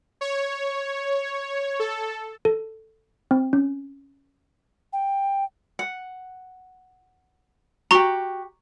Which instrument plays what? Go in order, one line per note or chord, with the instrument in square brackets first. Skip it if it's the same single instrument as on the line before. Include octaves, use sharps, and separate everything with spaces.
[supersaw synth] C#5
A4
[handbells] A4
C4
C#4
[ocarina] G5
[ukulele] F#5
[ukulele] F#4 G4 [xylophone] A#5 C#6